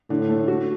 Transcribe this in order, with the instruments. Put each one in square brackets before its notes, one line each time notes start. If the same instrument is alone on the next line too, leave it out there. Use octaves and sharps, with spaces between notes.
[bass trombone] A2 [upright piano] D3
[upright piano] A3
F#4